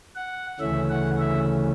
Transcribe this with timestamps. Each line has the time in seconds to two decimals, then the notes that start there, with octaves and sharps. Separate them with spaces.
0.16 F#5
0.60 D2 C#3 E3 A3 C#4 E5
0.90 F#5
1.19 E5